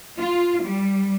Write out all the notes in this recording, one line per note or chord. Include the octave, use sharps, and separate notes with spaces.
F4
G3